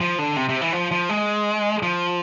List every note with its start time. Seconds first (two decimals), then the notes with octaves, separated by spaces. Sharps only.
0.01 F3
0.19 D3
0.36 C3
0.49 C3
0.61 E3
0.73 F3
0.91 F3
1.09 G#3
1.83 F3